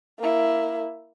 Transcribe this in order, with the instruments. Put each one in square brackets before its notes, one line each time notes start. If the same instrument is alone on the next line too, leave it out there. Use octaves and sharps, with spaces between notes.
[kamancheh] A#3 E4